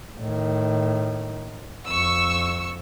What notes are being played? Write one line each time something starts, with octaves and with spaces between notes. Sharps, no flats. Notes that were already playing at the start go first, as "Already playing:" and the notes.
A2 D#3
F2 C#6 E6